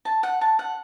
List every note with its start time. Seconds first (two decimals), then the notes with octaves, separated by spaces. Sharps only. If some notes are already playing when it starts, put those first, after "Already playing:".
0.05 A5
0.23 F#5
0.41 A5
0.59 F#5